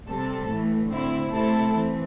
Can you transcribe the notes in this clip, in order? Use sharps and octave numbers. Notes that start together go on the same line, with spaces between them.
C3 G3 C4 A4
A2 E3 A3
D3 C4 E4
C3 A3 C4 E4 A4
E3 C4